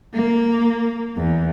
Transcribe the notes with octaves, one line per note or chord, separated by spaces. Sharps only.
A#3
E2